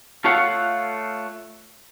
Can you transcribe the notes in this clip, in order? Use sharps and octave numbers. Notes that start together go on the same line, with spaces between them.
A3 F4 A4 C#5 F5 F#5